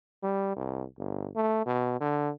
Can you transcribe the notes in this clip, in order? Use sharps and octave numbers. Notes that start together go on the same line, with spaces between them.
G3
C2
G1
A3
B2
D3